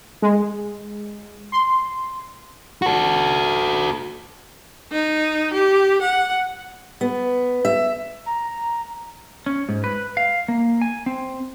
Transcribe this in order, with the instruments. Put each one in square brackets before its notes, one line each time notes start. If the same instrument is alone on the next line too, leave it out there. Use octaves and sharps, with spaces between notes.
[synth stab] G#3
C6
[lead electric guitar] F#4 A4
[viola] D#4
G4
F#5
[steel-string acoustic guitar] B3
E5
[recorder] A#5
[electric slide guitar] C#4
G#2
B4
F5
A#3
G#5
C4